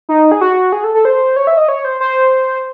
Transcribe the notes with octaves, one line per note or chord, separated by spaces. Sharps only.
D#4
G#4
F#4
G#4
A4
A4
C5
C#5
E5
D#5
C#5
C5
C5